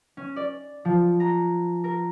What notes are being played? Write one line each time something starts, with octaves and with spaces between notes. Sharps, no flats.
C#4
D5
F3
A#5
A#4